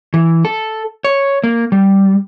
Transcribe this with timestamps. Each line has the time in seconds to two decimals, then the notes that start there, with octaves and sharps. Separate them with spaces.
0.14 E3
0.45 A4
1.04 C#5
1.44 A#3
1.72 G3